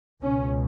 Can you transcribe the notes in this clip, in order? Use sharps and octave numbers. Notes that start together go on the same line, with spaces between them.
C#2 B2 C#4